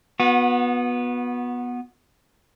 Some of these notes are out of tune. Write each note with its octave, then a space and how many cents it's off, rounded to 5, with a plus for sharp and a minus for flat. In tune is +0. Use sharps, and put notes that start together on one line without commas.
B3 -10 F#4 -35